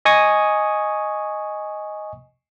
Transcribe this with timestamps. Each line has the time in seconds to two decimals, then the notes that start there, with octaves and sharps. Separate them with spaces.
0.05 D#5 G#5 C#6 D#6